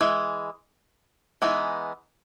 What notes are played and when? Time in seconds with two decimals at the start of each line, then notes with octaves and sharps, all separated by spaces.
0.01 E3 G#3
1.42 E3 G#3 B3 D#4